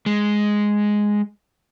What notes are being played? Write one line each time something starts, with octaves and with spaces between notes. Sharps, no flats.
G#3